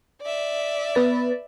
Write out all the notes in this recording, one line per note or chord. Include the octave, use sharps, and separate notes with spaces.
D5 E5
B3 B4 A6